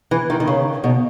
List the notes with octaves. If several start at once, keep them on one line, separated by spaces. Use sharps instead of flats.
E3
D#3
D#3
C#3
B2